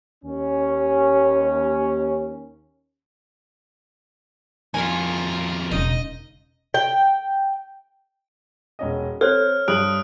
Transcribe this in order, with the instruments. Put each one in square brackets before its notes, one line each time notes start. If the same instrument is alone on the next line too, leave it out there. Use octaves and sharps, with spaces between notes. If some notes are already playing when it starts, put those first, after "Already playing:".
[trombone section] D#2 C#4
[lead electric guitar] F2 D#3 [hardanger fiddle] F4 A#4 [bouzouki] G#5
[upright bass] E1 C#3 [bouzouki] D#4 [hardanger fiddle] D#5
[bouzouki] G5
[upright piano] E1 C#4 D#5
[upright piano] C4 [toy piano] A4 C5 [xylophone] C#5 [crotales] F6
[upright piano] G2 F#7 [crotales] D#6 F#6 D7